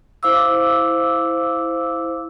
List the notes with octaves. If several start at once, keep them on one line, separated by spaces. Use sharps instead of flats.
E4 C5 F5 D6 E6